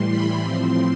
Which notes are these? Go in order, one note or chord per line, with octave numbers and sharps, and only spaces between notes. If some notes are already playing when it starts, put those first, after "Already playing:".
Already playing: A2 E3 G3 C6
B5
A2 F3 C4 C6